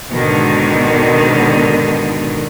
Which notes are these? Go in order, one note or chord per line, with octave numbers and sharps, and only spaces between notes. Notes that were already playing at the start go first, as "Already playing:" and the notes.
G#2 B2 D3 D#3